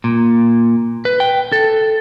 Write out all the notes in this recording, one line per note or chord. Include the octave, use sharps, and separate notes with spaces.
A#2
B4
G5
A4